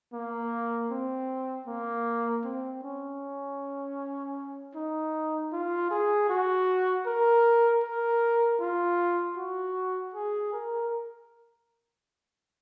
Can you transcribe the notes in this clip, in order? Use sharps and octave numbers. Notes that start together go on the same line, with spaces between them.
A#3
C4
A#3
C4
C#4
D#4
F4
G#4
F#4
A#4
A#4
F4
F#4
G#4
A#4